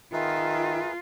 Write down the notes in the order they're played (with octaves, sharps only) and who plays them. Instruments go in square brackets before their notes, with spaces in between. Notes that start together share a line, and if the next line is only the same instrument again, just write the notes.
[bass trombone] D#3 [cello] F4 [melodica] G#4 A#4 B4 [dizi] E5